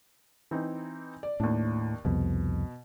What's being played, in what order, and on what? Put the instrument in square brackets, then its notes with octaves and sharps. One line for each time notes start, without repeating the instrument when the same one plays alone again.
[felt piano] E3 C4 D#4
D5
[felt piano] D#2 D4 [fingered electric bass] A2
[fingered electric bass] C2 F2 [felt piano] B2